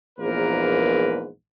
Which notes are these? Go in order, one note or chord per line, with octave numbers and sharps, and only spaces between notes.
A#1 E2 G#2 A#3 A#4 B4